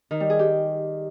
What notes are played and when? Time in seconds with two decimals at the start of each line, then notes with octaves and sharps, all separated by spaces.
0.11 D#3
0.20 G3
0.30 G#4
0.39 G4